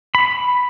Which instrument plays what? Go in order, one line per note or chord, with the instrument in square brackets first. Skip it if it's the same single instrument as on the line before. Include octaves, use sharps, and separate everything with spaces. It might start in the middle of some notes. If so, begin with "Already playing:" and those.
[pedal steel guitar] B5